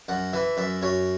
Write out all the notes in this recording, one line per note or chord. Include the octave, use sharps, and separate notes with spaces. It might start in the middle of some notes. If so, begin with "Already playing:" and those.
F#2 F#5
E3 E5
F#2 E5
F#2 C#5